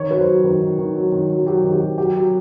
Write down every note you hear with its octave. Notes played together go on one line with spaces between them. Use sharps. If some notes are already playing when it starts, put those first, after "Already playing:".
Already playing: D#3 C#5
F#3 B4
C5
F#3
D#3 B4
D#3
D#3
F#3
D#3
F#3
F#3 G4
D#3
G4
F#3
F#3 G4
F#3